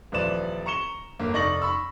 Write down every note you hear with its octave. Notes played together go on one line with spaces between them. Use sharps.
D#1 E3 F3 B4 D5 E7
A#5 C#6 C#7 E7 G7
G1 A#3
F1 D#4 D5 C#6 A#6 F#7
B5 C#6 E6